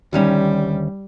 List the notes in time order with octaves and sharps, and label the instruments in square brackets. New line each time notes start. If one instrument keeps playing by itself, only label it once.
[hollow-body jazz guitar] D2 D#3 C#4 [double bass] G3